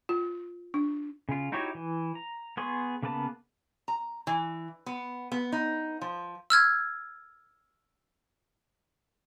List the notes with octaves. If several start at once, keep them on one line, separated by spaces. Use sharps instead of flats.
F4
D4
C#3 F4
D#4 E4 F#4 G4 C#5
E3
A#5
B3 G#4 C6 C#6 D#6
C#3 A#3 B3 B4 A5
A#5
E3
B3
B3
D#4
F3
E6 F6 G#6